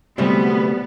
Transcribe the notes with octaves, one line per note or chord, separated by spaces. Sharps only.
D2 A2 C3 G3 G#3 B3 C4